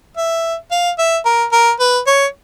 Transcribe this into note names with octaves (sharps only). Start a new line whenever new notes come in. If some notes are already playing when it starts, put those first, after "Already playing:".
E5
F5
E5
A#4
A#4
B4
C#5